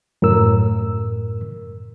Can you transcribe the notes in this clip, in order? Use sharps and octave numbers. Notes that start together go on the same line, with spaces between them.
F#2 A2 A#4 E6